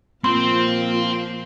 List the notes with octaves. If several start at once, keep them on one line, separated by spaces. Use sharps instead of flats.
A#2 F3 A#3 C4 F4 C6